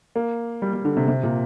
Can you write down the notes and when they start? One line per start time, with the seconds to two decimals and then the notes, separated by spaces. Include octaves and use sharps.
0.16 A#3
0.62 G3
0.73 G3
0.85 D3
0.97 C3
1.08 C3
1.23 A#2